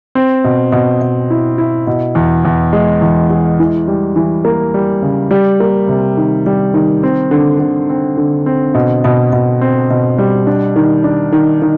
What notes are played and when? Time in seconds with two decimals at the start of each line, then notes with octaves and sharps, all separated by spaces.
0.15 C4
0.44 B2
0.72 B2
1.01 B2
1.30 E4
1.58 E4
1.87 B2
2.15 E2
2.45 E2
2.73 G#3
3.01 E2
3.30 G#3
3.59 E3
3.87 G3
4.16 E3
4.45 A#3
4.74 G3
5.02 C#3
5.31 G3
5.60 A#3
5.88 C3
6.17 D#3
6.46 G3
6.74 D#3
7.03 C4
7.31 D3
7.60 D3
7.90 C4
8.18 D3
8.46 C4
8.74 B2
9.04 B2
9.33 B2
9.61 C4
9.90 B2
10.18 G3
10.47 D4
10.76 D#3
11.04 D4
11.32 D#3
11.62 D#3